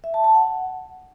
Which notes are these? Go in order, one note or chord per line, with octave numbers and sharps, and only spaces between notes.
E5
A5
A5
F#5